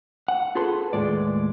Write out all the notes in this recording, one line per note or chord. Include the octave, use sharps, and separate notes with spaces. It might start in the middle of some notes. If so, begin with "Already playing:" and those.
F#5
F4 G#4 A4 B4 C6
D#2 A2 G#3 D5